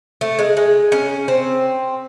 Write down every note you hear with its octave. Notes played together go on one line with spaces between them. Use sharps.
A3
G#3
G#3
C#4
C4